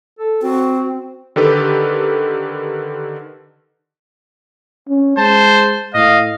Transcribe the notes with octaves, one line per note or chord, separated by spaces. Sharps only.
A4
C4 F#4
D3 D#3 G4 A4 B4
C#4
G#3 C5 A5
A2 D#5 F5